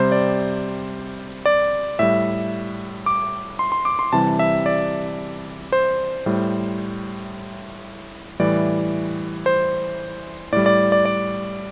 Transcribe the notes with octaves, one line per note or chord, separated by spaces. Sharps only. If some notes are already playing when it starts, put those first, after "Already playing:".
Already playing: C3 G3 C5
D5
D5
A2 G3 E5
D6
C6
C6
D6
C6
C3 E3 G3 A5
E5
D5
C5
A2 G3
A2 E3 G3 D5
C5
A2 G3 D5
D5
D5
D5